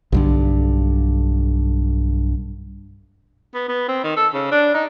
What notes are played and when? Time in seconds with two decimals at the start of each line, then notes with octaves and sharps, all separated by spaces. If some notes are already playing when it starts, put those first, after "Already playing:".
0.12 B1 G2 D3
3.55 B3
3.69 B3
3.88 C4
4.04 D#3
4.16 A4
4.34 C#3
4.52 D4
4.74 D#4